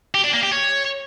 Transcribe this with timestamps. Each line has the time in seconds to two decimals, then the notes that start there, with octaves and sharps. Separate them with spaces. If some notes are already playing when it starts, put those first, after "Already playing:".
0.14 G4
0.24 D4
0.33 A#3
0.43 G4
0.52 C#5